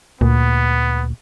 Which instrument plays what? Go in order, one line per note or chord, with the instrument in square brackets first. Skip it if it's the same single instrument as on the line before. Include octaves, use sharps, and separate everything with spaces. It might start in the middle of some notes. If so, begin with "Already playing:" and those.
[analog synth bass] D2 [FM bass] A#2 [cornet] B3